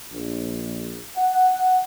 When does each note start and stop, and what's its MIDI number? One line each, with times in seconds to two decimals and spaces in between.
0.12 1.00 34
1.16 1.82 78